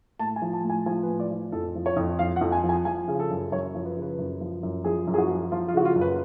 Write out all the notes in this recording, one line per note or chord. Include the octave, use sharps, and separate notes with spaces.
A2 A5
G#5
F3
A5
A2
G#5
F3 G#5
B4
A2
D5
F3
F2 A4
F3
C#5
F2
F3 F5
F#5
F2
G#5
F3
G#5
F3 G#5
C#3
A4
F#2
F#2 C#5
F3
B4
C#3
B4
F#2
F3
F#2
F3 G#4
F#2
G#4
F#4
F3
F3 F4
F4
C#3 F#4
F4
F#2
B4